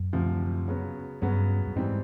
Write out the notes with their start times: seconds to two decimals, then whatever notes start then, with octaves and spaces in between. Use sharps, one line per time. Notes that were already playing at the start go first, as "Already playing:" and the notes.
Already playing: F#2
0.13 D2 C3 F3
0.68 C#3 F#3 B3
1.22 G2 C#3 F#3 B3
1.67 G2
1.75 G#2 E3 G3 C4 D#4